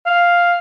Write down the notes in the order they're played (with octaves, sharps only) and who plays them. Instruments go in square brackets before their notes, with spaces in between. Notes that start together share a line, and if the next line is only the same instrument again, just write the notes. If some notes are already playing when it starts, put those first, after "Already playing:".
[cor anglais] F5